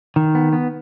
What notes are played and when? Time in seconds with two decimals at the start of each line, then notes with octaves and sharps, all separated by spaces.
0.16 D#3
0.35 B3
0.53 B3